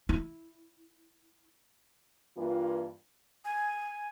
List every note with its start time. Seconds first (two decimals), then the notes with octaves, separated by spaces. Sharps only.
0.09 E4
2.38 G2 E3 A#3 F4
3.45 G#5